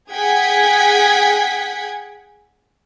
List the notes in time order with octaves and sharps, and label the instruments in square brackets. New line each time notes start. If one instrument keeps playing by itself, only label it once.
[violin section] G#4 F#5 G5 G#6 B6